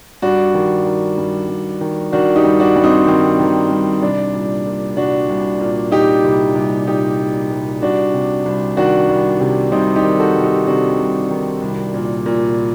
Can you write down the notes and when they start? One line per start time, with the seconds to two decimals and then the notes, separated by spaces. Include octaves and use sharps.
0.22 G2 D4 F#4
0.54 D#3
0.86 D#3
1.18 G2
1.49 G2
1.81 D#3
2.13 D#3 D4 F#4
2.36 D#4 G4
2.44 G2
2.60 D4 F#4
2.76 G2
2.84 C4 D#4
3.07 D#3 C4
3.40 D#3
3.71 G2
4.02 C2 D4
4.34 A#2
4.66 A#2
4.97 C2 D4 F#4
5.29 C2
5.60 A#2
5.92 A#2 D#4 G4
6.24 C2
6.55 C2
6.87 A#2 D#4 G4
7.19 A#2
7.51 C2
7.82 C2 D4 F#4
8.14 C3
8.46 C2
8.77 D#3 D4 F#4
9.09 C2
9.40 C3
9.72 C2 C4 D#4
9.96 D#4 G4
10.04 D#3
10.20 F#4 A4
10.36 C2
10.43 D#4 G4
10.67 C3 D4 F#4
10.99 C2
11.30 D#3
11.62 C2
11.94 A#2
12.26 A#2